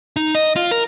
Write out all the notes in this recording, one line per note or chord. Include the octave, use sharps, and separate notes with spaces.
D#4
D#5
F4
A#4